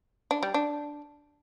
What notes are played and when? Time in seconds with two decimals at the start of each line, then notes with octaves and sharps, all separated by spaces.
0.31 D4
0.43 G3
0.54 D4